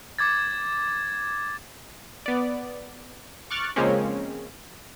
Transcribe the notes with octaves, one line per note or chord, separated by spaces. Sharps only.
D6 G#6 A6
B3 D5
C#6 D6 F6 F#6 A6
C#3 F3 G#3 A#3 C4 C#4